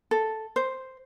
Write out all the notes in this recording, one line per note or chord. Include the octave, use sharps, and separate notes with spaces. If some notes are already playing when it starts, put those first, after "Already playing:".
A4
C5